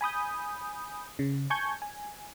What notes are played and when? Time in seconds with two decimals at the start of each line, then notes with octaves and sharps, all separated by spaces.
0.01 G#5 B5 D#6 G6
1.19 C#3
1.50 G#5 A5 C#6 G6 G#6
1.82 G#5